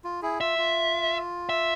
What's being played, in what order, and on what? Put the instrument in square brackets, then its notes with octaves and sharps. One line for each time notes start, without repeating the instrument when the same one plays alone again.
[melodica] F4
E4 G#4
[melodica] F4 [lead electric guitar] E5
[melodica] F4
[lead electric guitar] E5